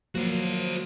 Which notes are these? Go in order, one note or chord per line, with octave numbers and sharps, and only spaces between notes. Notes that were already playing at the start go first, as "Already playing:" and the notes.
F3 F#3 A#3 F#4 C5